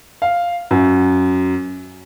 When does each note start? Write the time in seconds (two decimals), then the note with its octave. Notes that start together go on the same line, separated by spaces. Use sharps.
0.22 F5
0.71 F#2